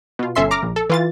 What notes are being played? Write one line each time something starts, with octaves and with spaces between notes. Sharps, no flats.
B2 F4
G1 C#4 A4 E5 C6 C7
A#5 D6 F6 A#6
A#1
A4
E3 F4 A6